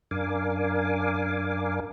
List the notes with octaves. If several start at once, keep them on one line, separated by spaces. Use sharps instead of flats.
F#2 D4 A#4 F5 G#5 D6